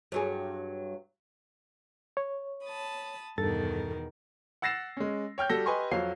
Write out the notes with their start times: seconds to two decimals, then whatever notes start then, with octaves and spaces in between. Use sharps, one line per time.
0.12 G2 F#3 G#4
2.17 C#5
2.64 A5 B5 D#6
3.38 E2 G2 B2 D#3 A4 A6
4.62 F#5 E6 A6 A#6 C7 E7
4.97 G#3 C#4
5.38 C#5 G5 F6 G6
5.49 G3 F#4 A4 E6 A#6 G7
5.66 G4 B4 D#5 G#5 C6 C#6
5.91 F2 F#3 C#5 F5 C7